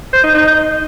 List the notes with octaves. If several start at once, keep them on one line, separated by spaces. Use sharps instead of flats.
C5
D#4
D#4